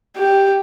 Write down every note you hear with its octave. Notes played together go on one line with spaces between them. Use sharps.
G4